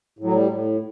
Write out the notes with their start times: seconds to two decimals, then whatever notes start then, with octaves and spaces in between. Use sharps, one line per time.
0.19 A2
0.24 F#3
0.33 G3
0.49 A2